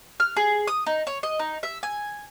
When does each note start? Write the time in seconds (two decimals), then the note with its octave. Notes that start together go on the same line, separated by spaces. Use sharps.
0.20 F6
0.37 G#4
0.68 D#6
0.86 D#4
1.07 C#5
1.23 D#5
1.39 D#4
1.63 E5
1.83 G#5